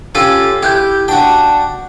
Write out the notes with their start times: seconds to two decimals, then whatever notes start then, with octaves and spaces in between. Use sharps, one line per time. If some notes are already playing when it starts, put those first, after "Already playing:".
0.15 C#4 F4 G4 A4
0.63 E4 G4 F#6 G6
1.08 D4 F#4 F#5 G5